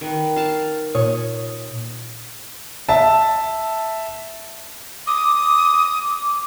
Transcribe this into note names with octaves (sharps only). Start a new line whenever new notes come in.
D#3 B4
F5 A5
A#2 C#5 D#6
E5 A5
D6 D#6